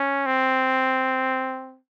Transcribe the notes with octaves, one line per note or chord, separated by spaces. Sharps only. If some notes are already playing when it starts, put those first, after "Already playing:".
Already playing: C#4
C4